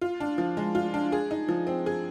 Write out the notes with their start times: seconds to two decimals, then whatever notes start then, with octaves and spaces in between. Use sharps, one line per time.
0.01 F4
0.20 D4
0.38 F3
0.57 G#3
0.75 F4
0.94 D4
1.12 G#4
1.31 D#4
1.49 F3
1.67 C4
1.86 G#4